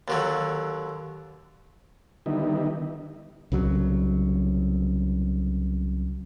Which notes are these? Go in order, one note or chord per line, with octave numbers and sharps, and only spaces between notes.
D#2 D3 F#3
D3 D#3 G3 B3 D#4 E4
C2 C#3 F#3